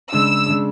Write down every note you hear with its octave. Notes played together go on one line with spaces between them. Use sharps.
C#3 G#3 D4 E6
C#3 G#3 D4